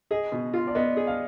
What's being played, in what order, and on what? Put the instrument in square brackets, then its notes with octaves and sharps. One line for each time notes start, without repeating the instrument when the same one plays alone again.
[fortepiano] G#4 [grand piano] D#5
[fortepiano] B2
F4
[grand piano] D5
[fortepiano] B3 [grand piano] D#5
[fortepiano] G#4
[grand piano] F5